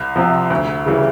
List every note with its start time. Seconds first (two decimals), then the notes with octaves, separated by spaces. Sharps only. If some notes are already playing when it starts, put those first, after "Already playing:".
Already playing: C2
0.16 C3 F3
0.50 D2
0.86 C#3 E3 G3